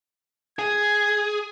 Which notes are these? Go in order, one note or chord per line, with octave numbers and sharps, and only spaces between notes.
G#4 G#6